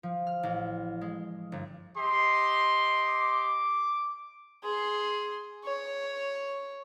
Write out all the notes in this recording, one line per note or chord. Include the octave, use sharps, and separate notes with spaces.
F3
F6
A1
G#3
G1
G4 D#5 C6
D6
G#4 C6
C#5